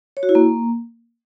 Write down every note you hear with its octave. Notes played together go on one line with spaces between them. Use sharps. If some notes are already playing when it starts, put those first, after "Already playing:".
C#5
F#4
E4
A#3